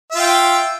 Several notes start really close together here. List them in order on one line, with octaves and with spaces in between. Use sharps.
E5 F4 G5